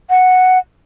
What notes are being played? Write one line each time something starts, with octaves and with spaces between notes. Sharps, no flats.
F#5